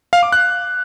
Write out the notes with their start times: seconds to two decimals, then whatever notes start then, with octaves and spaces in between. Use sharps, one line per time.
0.13 F5
0.23 D6
0.32 F#6